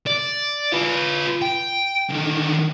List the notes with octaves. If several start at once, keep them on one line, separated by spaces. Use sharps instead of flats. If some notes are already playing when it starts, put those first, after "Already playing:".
D5
F4 B4
G5
D3 D#3